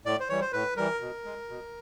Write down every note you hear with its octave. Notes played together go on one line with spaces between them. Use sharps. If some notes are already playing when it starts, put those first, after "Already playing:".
A2 D5
C5
E3 G3 C#5
C5
A2 B4
E3 G3 A#4
B2
G#3
B2